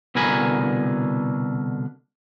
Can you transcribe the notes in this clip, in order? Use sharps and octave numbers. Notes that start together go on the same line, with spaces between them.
C2 B2 D3 A#4 G#5 B5